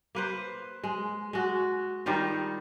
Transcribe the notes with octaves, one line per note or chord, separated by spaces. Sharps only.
A#3 B4 C5
G#3
G#3 F#4
D#3 G3 D#4 F4